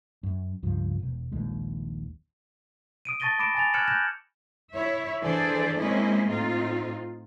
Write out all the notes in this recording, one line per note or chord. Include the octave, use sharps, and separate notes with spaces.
F#2
C#2 G2 F3
E1
D#1 A#1 D#2 G#3
D#6 D7 D#7
A5 C#6 A6 A#6 D#7 G7
B5 D6 A#6 D7 E7
G#5 A6 F7
F6 F#6 G#6 C#7 E7 F#7
F#6 G6 A#6 E7
E4 C#5 E5
E3 D4 G#4 A4 C5 D5
G#3 A#3 C4 C#4 E4 D#5
A2 C4 D#4 F4